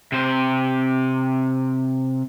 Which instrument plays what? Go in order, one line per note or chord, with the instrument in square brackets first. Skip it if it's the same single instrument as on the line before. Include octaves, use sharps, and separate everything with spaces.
[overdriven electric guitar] C3 C5